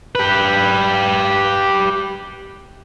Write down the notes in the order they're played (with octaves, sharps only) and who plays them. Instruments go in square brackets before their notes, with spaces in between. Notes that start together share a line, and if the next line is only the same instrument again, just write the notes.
[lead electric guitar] G4 B4